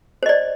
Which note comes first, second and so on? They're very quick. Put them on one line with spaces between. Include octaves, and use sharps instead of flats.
C5 D#5 D5